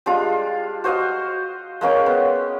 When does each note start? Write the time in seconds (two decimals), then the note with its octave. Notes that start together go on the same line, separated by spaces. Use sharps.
0.06 G3 G#3 D4 F4
0.84 F#4 C5 D#5 F5
1.81 G#3 A#3 C#4 G5
2.06 B3